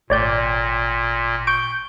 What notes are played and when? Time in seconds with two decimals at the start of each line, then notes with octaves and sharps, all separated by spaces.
0.10 G#1 A#2 A3 C#5 D5 G5 G6
1.47 C#6 G6 D7